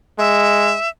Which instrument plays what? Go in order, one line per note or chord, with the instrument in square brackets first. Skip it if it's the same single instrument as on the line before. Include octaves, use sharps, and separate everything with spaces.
[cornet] G#3 [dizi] E5